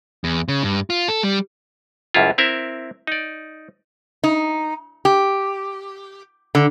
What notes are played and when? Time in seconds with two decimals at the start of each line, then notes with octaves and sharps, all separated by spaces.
0.24 E2
0.48 C#3
0.63 G2
0.90 F4
1.08 A4
1.23 G3
2.14 C#2 F#2 G3 E4 F4
2.38 C4 E4 A#4 E5
3.07 D#4 D5
4.24 D#4
5.05 G4
6.55 D3